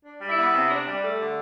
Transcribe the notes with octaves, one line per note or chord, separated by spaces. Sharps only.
D4
G3
E4 E5
B3
C3
D4
G3
A3
D3